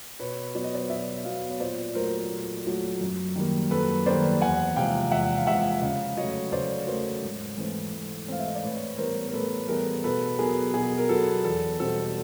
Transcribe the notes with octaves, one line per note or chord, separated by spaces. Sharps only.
B2 B4 C#5
F#3 B3 D5
D#5
C5 D5
B2 D5 E5
F#3 B3 D#5 F5
C#5
A#2 C5 D5
F#3 A3 A#4 C5
A#2
F#3 A3
F#2
D#3 G3 A#3
F#2 A4 B4
D#3 G3 A#3 C5 D5
E2 F#5 G#5
C3 F3 G#3 F5 G5
E2 E5 F#5
F5
C3 F3 G#3 E5 F#5
C#3 D#5 F5
F#3 A3 C#5 D#5
C#3 C5 D5
F#3 A3 A#4 C5
G#2
E3 A3 C4
G#2
E3 A3 C4 F5
E5
D#5
D5
A2 B4 C#5
E3 G3 B3 A#4 C5
A#4
A2 A4 B4
E3 G3 B3 G#4 A#4
B2 A4 B4
F#3 B3 G#4 A#4
B2 G#4
A#4
F#3 B3 A4
E2 A4
B2 G3 C4 A4